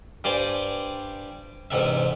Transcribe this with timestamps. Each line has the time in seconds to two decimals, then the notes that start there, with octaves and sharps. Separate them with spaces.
0.24 G2 G4 C5 D5 G#5
1.71 A1 G#2 C3 E5